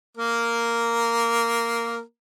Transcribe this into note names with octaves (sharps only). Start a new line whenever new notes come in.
A#3 A#4